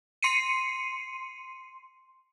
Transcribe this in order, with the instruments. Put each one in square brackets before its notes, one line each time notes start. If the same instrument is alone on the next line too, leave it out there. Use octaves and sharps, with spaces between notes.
[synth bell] C6 C7 C#7 D#7